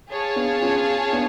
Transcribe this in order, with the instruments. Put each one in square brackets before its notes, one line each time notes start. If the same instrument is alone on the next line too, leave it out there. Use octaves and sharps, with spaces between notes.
[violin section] G#4 C#5 F5 A5
[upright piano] B3 D4
C#4 F4
B3 D4